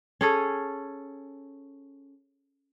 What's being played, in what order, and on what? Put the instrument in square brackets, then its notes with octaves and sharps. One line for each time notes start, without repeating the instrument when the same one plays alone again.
[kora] C#4 G#4 A4